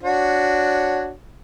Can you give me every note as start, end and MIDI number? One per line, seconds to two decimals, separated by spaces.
0.03 1.09 62
0.03 1.09 66
0.03 1.09 73